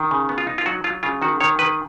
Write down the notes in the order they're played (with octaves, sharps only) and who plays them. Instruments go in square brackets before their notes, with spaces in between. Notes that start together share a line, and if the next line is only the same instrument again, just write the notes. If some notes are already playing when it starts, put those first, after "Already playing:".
Already playing: [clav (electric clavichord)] D#3
C#3
B3
F4
D#4
F4
F#3 F#4
F#3 F4
C#3 F4
D#3 F#4
D#3 C#5
D#3 B4